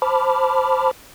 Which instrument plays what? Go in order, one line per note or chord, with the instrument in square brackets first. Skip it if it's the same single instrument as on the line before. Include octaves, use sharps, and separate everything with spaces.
[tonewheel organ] C5 A5 B5 D6 F6